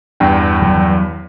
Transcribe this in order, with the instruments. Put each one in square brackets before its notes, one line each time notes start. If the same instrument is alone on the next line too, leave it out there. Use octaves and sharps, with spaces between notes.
[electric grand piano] E2 G2 G5
[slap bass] E3 F#3